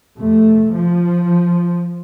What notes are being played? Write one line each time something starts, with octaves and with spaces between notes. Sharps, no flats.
F2 C3 A3
F3